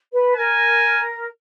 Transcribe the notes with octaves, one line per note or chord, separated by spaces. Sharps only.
B4
A#4 G#5